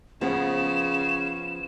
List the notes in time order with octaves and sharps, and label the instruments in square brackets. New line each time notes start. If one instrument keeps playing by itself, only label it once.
[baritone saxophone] C#3 [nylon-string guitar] F3 B3 [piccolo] E7